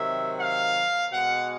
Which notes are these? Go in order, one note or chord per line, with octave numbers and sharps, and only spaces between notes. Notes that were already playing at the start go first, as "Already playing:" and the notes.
Already playing: C3 D#3 F#3 E5
F5
B2 G#3 F#5